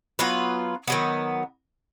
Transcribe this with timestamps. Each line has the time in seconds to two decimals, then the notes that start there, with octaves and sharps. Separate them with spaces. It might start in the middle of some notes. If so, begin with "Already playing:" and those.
0.19 F#3 B3 F4 B4
0.88 D#3 F#3 B3